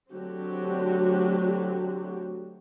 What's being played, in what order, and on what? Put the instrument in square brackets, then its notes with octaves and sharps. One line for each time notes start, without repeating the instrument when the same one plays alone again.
[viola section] D3 F#3 A3 C4 F#4 G4